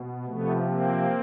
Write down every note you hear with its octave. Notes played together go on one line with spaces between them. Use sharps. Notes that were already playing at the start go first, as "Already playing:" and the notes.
Already playing: B2
C3 F3 A3 B3
A#3 C4